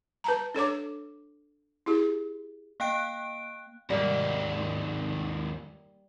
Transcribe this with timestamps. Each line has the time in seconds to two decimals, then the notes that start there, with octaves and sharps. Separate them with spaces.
0.24 B4 A5 A#5
0.54 D4 A4 C#5 D6
1.86 E4 G4 G#4
2.80 A#3 F5 G5 F#6 D7
3.90 D#2 G#2 G3 A#3